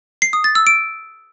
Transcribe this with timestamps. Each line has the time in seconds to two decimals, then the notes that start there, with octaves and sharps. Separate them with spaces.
0.22 C7
0.33 D#6
0.44 A6
0.55 E6
0.67 D7